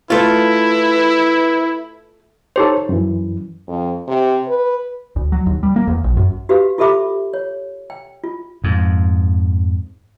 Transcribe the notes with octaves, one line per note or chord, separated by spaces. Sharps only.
A3 E4 F4 B4
D#4 G4 A4 C5 C#5 C6
F#2 E3
F2
C3
B4
D2
F#3
D#2
G3
A#3
E2
A#1
F#2
F#4 G4 B4 F5
F4 G4 A4 E5 B5 D6
C#5
G5
F4
F2 G#2